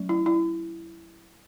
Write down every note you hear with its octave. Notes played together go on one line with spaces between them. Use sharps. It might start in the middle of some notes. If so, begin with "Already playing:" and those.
Already playing: F#3 A3 C#4
E4
E4